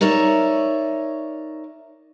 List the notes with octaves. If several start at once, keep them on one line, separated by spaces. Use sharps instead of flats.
D#4 A#4 C#5 D5 E5